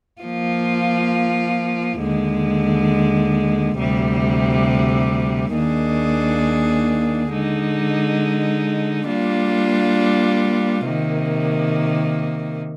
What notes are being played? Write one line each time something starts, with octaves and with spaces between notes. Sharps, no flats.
F3 A#3 F4
D#2 D3 G#3
D2 C3 G3
D#2 D#3 A#3 D4 G#4
D3 G#3 D#4
G3 A#3 D4 F4
C3 D#3 A#3